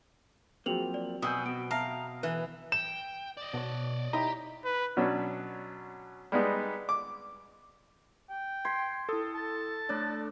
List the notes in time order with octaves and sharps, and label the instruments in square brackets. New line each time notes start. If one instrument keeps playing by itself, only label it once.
[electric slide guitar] F3 A#3 [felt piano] F#3 C4 [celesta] G#4 F7 F#7
[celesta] D5
[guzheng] B2 [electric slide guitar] F#4 G5 G#5 [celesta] D#6 E6 G6
[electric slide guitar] B3 F#4 [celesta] D7
[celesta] E5 A5 A#6 [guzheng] F5 [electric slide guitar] A#5
[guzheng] E3 [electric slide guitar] B4
[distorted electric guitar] G5 [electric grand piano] E7
[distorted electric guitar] D5 D#5
[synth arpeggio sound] B2 [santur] C#5 F#5 A5
[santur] D#4 E4 C#5 [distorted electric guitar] G4 [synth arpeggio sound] D#5 [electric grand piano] A#5
[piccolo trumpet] B4
[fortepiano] B2 F#3 C#4 D4
G3 G#3 B3 D#4
D6
[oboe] G5
[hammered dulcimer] C6 [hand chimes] G#6 B6
[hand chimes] E4 D#6 [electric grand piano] A4
[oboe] A5
[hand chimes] A3 C#5 D5 [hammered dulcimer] D4